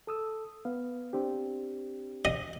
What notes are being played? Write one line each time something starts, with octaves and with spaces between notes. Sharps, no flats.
A4 D#6 E6
B3 F5
C4 D4 G4
D#5